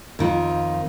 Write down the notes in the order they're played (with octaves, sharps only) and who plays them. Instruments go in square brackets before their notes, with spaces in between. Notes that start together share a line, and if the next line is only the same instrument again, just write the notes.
[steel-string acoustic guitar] F2 D#3 F4